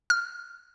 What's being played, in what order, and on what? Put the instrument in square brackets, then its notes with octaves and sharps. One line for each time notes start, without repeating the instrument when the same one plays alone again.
[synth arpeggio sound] F6